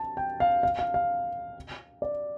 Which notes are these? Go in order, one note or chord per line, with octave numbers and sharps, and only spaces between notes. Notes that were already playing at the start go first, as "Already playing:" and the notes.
Already playing: A5
G5
F5
F5
F5
F5
D5